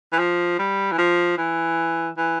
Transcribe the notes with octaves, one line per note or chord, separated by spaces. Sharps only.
E3
F3
G3
E3
F3
E3
E3